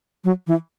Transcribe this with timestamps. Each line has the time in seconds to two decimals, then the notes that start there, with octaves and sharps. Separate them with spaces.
0.24 F#3
0.47 E3